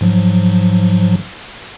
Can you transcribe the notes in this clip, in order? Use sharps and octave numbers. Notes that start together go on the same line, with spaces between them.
G#2 F3 F#3